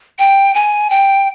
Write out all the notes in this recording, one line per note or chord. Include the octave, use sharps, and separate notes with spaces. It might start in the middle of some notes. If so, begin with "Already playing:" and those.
G5
G#5
G5